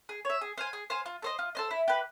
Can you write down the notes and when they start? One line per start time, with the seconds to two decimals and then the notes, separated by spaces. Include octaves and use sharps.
0.09 G#4
0.25 C#5 E5
0.41 G#4
0.58 C5 F5 G#5
0.73 G#4
0.90 C5 F5 G#5
1.06 F4
1.22 A4 C5 D#5
1.39 F4
1.55 A4 C5 D#5
1.71 E4
1.88 G4 B4